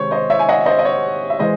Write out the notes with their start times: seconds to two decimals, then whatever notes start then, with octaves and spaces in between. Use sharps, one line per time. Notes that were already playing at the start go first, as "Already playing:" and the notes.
Already playing: C3 D#3 G#3 C5 C#5
0.11 C5 D#5
0.30 C#5 E5
0.39 G#5
0.49 D#5 F#5
0.66 C5 D#5
0.79 D#5
0.85 C#5
1.30 E5
1.39 E3 G#3 C5 D#5